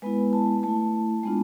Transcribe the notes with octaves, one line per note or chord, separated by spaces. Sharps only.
G#3 B3 E4 B4
A5
A3 E4 A5
G#3 B3 D4 F4